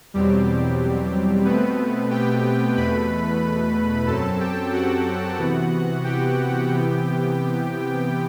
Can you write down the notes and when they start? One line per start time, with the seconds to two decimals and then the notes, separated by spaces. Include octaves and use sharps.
0.14 E2 B2 F#3 G3 C4 G4
1.45 B2 A3 B3 C4 B4
2.10 G4 G5
2.76 E2 B2 A3 B4 B5
4.07 F#2 F#3 C4 A4 A5
4.40 G4 G5
4.73 F#4 F#5
5.38 C3 E3 B3
6.04 G4 G5
6.69 C3 E3 B3